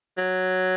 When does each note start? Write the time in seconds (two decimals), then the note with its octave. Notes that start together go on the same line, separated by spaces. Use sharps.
0.18 F#3